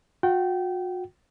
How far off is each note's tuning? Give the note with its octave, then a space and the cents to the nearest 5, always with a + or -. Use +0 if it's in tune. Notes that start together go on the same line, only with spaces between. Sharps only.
F#4 -40 G5 -25